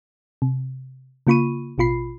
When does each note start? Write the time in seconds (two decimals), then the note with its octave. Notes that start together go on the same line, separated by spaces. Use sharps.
0.42 C3
1.27 C#3 A#3 F4 B5 C#6 D#7
1.78 A1 B2 F4 B5 C7